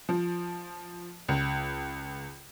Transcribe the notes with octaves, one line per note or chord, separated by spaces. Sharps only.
F3
C#2